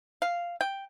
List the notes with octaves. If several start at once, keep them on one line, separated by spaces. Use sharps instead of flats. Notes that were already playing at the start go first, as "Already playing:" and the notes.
F5
G5